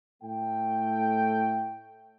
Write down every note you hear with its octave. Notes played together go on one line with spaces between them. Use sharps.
A2 A3 G5